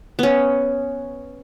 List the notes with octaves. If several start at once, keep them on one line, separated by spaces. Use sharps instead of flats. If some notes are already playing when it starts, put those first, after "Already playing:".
B3 C#4